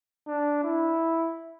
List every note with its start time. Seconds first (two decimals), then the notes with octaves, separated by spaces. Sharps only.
0.27 D4
0.64 E4